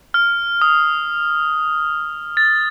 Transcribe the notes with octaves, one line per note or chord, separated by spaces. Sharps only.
F6
D#6
A6